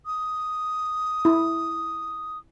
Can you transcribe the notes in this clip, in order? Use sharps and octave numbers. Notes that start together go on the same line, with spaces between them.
D#6
E4